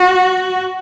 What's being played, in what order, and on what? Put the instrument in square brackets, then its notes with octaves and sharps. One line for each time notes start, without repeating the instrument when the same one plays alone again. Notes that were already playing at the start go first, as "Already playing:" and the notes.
Already playing: [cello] F#4